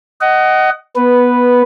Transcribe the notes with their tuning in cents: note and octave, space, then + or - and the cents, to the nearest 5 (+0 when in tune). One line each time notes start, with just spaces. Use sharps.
D#5 +0 F#5 +25
B3 -10 B4 +0